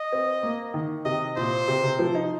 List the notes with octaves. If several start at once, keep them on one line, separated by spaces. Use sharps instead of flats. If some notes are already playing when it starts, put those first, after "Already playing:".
Already playing: D#5
C4
A#3
D#3
C3 D#5
A#2 C5
C3
C3
F3
D#4